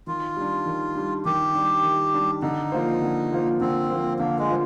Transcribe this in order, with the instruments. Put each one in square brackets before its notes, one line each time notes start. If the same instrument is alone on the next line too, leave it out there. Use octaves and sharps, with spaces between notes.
[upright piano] D#3 [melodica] F4
[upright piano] G3 D4
D#3
G3 D4
[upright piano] D#3 [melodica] G4
[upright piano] G3 D4
D#3
G3 D4
[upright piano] D3 [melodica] D#4
[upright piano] F3 A#3 F4 C5
D3
F3 A#3 F4 C5
[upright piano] D3 [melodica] C4
[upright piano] F3 A#3 F4 C5
[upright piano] D3 [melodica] A#3
[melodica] G#3
[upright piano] F3 A#3 F4 C5